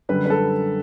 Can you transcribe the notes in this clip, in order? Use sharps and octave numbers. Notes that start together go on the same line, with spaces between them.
F#2 D3 G3 B4
B4
A4